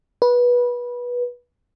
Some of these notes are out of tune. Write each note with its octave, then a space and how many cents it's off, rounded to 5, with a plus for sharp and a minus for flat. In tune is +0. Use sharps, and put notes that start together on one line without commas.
B4 -20